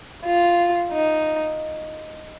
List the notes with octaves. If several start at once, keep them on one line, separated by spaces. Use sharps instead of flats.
F4
D#4